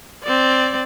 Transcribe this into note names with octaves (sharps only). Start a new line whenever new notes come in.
C4 D5